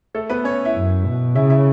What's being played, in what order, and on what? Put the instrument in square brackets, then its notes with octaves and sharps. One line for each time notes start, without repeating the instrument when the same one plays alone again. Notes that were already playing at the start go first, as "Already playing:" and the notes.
[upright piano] A3 A4
B3 B4
C#4 C#5
E4 E5
[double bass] F#2
B2
[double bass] C#3 [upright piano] E4 E5
[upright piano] E4 E5